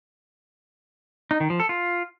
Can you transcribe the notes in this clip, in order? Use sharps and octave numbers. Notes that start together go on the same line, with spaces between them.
D#4
D#3
F3
A4
F4